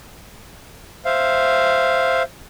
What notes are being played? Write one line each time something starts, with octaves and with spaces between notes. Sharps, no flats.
C5 E5 F5